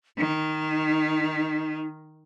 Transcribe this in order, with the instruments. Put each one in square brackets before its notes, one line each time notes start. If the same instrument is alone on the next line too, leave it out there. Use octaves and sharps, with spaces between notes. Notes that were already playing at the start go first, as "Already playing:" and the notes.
[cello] D#3 [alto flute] D#4